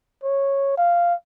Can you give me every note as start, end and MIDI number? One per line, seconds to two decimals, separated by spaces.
0.23 0.74 73
0.78 1.14 77